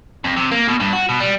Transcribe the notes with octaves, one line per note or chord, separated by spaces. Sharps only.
F2
C3
A#3
B2
G2
F#4
B2
G3